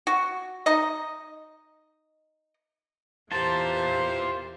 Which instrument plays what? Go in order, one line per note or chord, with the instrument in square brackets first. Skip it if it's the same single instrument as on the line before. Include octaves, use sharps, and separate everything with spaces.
[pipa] F#4
D#4 D#5
[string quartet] E2 E3 G4 [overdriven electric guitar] F4 A#4 [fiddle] C5 [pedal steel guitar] A5